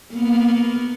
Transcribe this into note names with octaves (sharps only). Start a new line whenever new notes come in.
A#3 B3